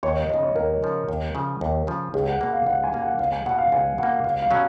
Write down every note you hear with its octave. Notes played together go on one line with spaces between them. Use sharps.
D#2 C#5
D#5
C#3 F3 D#5
C#5
D#2 A#4
C#3 F3
D#2
C#3 F3
D#2
C#3 F3
C#2 G#4
F#5
B2 A#3 F#5
F5
C#2 F#5
G#5
B2 A#3
F#5
C#2 F5
G#5
B2 A#3 F#5
F5
C#2 G#5
B2 A#3 F#5
C#2 F5
F5
B2 F#3 C#4